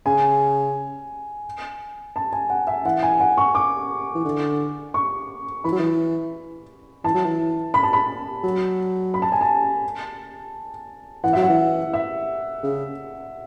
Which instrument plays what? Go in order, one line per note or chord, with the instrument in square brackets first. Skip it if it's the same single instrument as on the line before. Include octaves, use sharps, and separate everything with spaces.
[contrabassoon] C#3 [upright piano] G#5
[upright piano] A5
G#5
F#5
E5
[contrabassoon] E3 [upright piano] F#5
[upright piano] G#5
F#5
C#6
D6
[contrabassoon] E3
D3
[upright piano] C#6
[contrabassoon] E3 [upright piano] B5
[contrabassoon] F#3
E3
[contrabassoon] E3 [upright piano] A5
[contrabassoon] F#3
E3
[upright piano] B5
A5
B5
[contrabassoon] F#3
[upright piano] B5
A5
G#5
A5
[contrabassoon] E3 [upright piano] F#5
[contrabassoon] F#3 [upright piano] E5
[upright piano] F#5
[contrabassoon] E3
[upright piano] E5
[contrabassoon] C#3